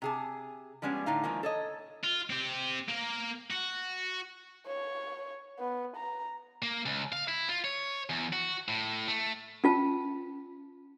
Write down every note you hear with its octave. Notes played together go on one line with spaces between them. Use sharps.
C3 G#4 A5
F3 G3 G#3 B3 C#4
A2 D3 D#4 F5
D#3 F3 G#3 A#3
A4 C#5 D#5
F4
C4 G4
A#3 A#4
F#4
C#5
B3
A#5
A#3
C#2
F5
E4
F4
C#5
E2
F#4
A2
A3
C#4 F4 A5